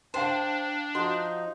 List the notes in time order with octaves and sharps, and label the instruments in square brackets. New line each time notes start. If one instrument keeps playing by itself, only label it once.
[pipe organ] D4 [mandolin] C5 [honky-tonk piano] F5 G5 A5
[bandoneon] F3 D#4 [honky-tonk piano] F#4 [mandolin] C6